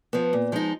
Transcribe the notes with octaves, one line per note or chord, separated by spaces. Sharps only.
F3 B3
A#2
F3 G#3 D#4